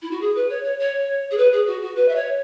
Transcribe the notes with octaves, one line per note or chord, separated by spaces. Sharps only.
E4
F#4
G#4
B4
C#5
C#5
C#5
G#4
B4
G#4
F#4
F#4
B4
E5
C#5